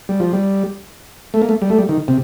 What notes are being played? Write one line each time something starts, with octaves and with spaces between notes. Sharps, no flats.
G3
F3
G3
A3
A#3
A3
G3
A3
G3
D#3
C3